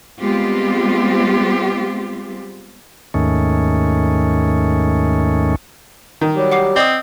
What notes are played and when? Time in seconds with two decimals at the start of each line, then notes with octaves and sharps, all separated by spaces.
0.20 G3 G#3 B3 C4 F4 G4
3.14 D#2 G#2 D#3 A3 C#4
6.21 D#3
6.36 F#3 G3 G4
6.52 F#5 D6 C7
6.76 C4 D5 D#5 D#6